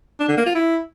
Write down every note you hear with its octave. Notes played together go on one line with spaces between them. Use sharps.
D4
D3
A#3
F4
E4